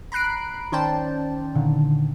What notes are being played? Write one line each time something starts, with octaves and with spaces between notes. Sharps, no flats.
A#5 B5 F#6 C7 D7
D#3 C#4 C5 D5 G5 A5
A#2 D3 D#3